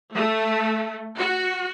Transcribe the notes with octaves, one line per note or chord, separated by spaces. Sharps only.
A3
F#4